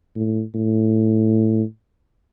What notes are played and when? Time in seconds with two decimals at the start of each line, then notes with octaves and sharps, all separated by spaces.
0.16 A2
0.55 A2